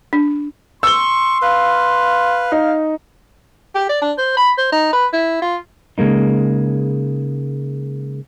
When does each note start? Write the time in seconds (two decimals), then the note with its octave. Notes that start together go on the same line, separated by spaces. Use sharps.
0.13 D4
0.83 C6 C#6 E6 G7
1.42 B4 F5
2.52 D#4
3.75 G4
3.89 D5
4.01 D4
4.18 C5
4.37 B5
4.58 C5
4.72 D#4
4.92 B4
5.13 E4
5.42 F4
5.98 C#3 G#3 A#3 D#4